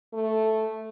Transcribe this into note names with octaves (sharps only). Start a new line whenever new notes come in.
A3